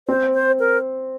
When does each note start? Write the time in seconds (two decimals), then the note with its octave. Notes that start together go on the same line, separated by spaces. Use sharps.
0.08 C4 C5
0.34 C5
0.59 A#4